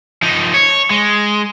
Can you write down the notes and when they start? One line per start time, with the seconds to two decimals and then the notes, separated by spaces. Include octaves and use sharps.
0.22 F3 D#4
0.54 C#5
0.90 G#3